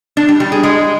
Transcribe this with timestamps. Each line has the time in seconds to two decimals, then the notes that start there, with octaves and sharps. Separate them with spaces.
0.17 D4
0.29 G3
0.40 G3
0.52 G#4
0.63 G#3